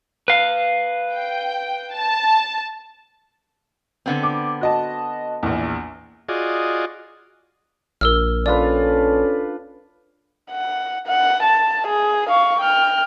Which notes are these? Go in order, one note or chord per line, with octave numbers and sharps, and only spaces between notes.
B4 F5
G5
A5
D3 B3 C4
D6
F#4 D#5 A5
A#1 E2
F4 F#4 G#4 D5 D#5
A#1 A#4 E6 F6
C#4 D4 F4 A4 B4 D5
F#5
F#5
A5
G#4
F5 C#6
G5 F6